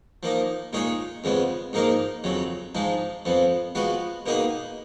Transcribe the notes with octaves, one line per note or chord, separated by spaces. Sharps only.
F3 A#3 D#4
A#2 G#3 D#4 G#4 C#5
F2 C#3 G#3 B3
G#2 F3 A#3 D#4 A#4
F2 C#3 F#3
G#2 F3 G#3 D#4
F2 F3 B3
F3 G#3 B3 F#4 B4
B2 A#3 D#4 G#4 B4